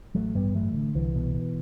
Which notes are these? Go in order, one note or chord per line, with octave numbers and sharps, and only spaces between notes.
A1 F#3 A3
G2 G3 B3
A1 F#3 A3
D3
C2 E3
B2
B2